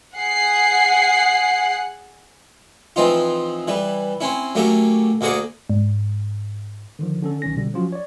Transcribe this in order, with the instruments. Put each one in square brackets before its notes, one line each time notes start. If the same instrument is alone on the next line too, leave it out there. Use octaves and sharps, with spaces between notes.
[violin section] G#4 F#5 C7
[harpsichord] E3 F3 C4 D#4 F4
E3 G3 B4
C4 C#4 E4
F#3 A3 A#3 C#4 G4 E5
D2 A#3 F#4 G#4 D5 C#6
[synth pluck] G#2
[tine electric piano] D3 D#3 F3
D3 C#4 A4
B1 D#3 C#4 A#6
B2 D3 G3
F3 F#3 C#4 F4 F#4
C#5 D5